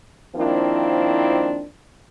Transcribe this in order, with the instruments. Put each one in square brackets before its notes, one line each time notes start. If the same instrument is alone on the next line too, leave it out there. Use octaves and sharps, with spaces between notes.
[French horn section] D#3 F3 A#3 C4 D4 E4